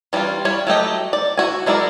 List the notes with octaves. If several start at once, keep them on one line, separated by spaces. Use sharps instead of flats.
E3 G3 C#4 D#4 F4
G3 E4 C#5
F#3 A3 G4 D#5
D5
E4 F#4 G#5
F#3 G#3 E4 A#4 D5